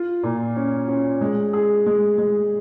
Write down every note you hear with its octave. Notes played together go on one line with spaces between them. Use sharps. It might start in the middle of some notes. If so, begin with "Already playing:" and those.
Already playing: F4
A#2
C#4
C#4
G#3
G#4
G#3
G#3